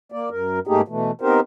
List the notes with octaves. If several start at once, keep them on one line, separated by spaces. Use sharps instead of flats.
A#3 D5
F#2 A#4
G#2 A3 A#3 D#4 G4 G#4
B2 E3 A3
B3 C4 D#4 G4 A#4 C5